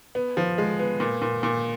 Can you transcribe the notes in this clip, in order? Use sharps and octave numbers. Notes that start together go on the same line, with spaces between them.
B3
F3
G#3
B3
A#2
A#2
A#2